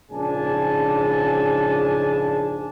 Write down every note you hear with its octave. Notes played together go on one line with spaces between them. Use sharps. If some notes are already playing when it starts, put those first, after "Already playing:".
A#1 G#2 C#3 D4 G#5 A5